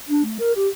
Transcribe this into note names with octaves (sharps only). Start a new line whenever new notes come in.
D4
A3
A#4
G4